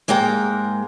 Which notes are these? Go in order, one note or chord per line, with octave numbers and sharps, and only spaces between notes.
G#2 G#3 A#3 A#4 G5